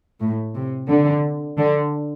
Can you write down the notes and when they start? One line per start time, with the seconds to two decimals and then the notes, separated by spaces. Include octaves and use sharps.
0.20 A2
0.55 C3
0.89 D3
1.58 D3